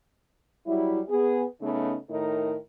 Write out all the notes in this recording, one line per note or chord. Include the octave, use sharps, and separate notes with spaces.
F#3 G3 E4
B3 G#4
C#3 A3 B3 D#4
A2 D#3 D#4 A#4 D#5